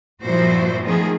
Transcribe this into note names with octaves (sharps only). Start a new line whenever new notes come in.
G2 A#2 F3 E4 F#4 C5
D#3 F3 A3 B3 F4 G#4